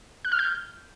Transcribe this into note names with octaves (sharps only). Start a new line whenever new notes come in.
F#6
F6
G6